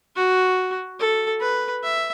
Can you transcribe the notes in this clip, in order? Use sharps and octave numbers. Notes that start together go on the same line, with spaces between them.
F#4
A4
B4
E5